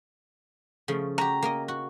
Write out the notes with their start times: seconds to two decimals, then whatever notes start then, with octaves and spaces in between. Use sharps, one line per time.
0.88 C#3 F3 A3
1.18 F#4 G4 A#5
1.42 A#3 A#4 D#5
1.68 F#4